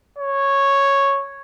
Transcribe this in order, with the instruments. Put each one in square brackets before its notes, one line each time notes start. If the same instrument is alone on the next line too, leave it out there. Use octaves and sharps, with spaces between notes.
[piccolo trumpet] C#5